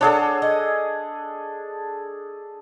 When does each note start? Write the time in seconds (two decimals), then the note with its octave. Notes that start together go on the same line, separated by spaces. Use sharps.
0.01 D4 G#4 A4 C#5 F5 F#5
0.42 D#5